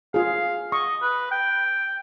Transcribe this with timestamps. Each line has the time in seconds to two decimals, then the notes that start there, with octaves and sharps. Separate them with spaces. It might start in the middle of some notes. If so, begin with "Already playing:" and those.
0.14 F4 G#4 F5
0.72 D#5 C#6
1.02 B4
1.31 G5